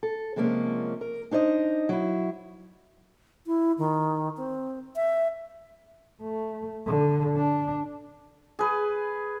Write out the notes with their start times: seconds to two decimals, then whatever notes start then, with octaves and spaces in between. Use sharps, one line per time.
0.03 A4
0.36 C3 F3 G#3 A#3 C#4
1.01 A#4
1.31 D4 D#4 C5 D#5
1.89 F#3 E4
3.46 E4
3.78 D#3
4.37 C4
4.96 E5
6.22 A3
6.86 D3
7.36 D4
8.59 G#4 B4